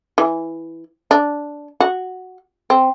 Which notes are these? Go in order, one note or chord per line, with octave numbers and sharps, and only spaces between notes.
E3
D4
F#4
C4